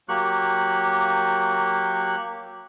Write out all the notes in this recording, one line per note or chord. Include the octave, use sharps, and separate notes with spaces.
F#3 A#3 G4 C#6 F#6